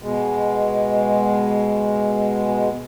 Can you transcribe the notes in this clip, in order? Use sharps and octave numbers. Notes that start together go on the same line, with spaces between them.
B2 G#3